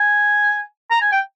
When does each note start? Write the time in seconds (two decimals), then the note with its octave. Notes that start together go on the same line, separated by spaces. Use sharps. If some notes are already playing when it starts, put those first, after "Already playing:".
Already playing: G#5
0.91 A#5
1.01 G#5
1.12 G5